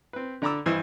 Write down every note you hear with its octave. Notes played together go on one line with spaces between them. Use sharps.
C4 B4
D3 D5 A#5 B5 D6 E6
G2 E3 C5 D#5 E6